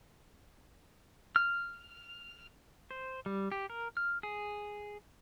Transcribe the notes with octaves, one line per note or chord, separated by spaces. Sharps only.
F6
C5
G3
G4
A#4
F6
G#4